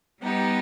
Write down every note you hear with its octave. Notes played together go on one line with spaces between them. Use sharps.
G3 B3 D#4 G4